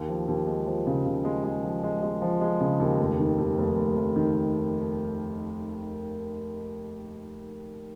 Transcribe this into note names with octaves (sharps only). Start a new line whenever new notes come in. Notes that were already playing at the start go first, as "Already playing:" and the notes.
Already playing: D#2
F3
D#2
G#3
F3
C#3
C#3
G#3
G#3
F3
G#3
G#3
F3
G#3
C#3
D#2
F1
D#3
D#2
F1
F1
F1
D#3